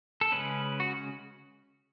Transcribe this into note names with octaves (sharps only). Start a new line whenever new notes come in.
A4
C#3 G#3 C#4 B4
F#4